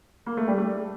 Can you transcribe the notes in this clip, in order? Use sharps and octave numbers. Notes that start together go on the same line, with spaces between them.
A#3
A3
G3
A3